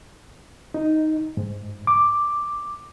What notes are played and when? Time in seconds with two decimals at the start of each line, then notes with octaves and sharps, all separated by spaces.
0.74 D#4
1.37 G#2
1.87 D6